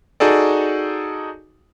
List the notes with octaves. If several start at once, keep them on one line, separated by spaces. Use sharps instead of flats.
D#4 F#4 G#4 A4 D5